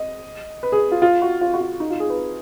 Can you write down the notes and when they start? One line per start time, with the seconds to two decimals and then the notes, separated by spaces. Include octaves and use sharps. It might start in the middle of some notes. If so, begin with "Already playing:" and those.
Already playing: D#5
0.63 B4
0.72 G#4
0.92 F4
1.02 F4
1.22 F#4
1.41 F4
1.54 F#4
1.61 F4
1.80 D#4
1.90 F4
2.00 G#4
2.10 B4